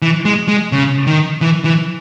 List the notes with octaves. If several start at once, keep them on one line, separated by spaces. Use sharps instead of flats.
E3
G#3
G#3
C#3
D#3
E3
E3